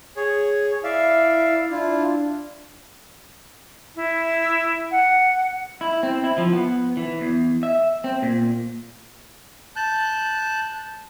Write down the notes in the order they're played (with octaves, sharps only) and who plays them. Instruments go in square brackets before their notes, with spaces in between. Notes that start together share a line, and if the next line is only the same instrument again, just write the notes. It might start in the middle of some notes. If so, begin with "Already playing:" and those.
[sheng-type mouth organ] G#4 C#5
[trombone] E4 [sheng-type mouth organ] D5 E5 F5
[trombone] D4 [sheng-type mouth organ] E4 F4
[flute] E4
F#5
[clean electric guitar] E4
C4
E4
F3
B3
E3
E2
E5
C4
A#2
[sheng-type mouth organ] A5 F#6 G6